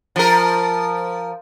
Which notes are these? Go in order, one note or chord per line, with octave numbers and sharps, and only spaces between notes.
F3 A#4